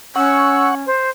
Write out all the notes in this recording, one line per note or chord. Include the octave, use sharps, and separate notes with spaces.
C#4 F#5 C#6 E6
C5